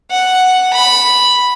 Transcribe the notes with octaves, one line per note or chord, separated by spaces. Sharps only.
F#5
B5